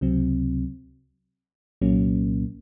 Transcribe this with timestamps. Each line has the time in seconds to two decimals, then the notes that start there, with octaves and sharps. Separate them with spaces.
0.01 C#2 C3 F#3 C4
1.81 C2 A#2 F#3 A#3 C#4